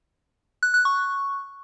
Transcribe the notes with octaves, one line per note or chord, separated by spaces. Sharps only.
F#6
F#6
C#6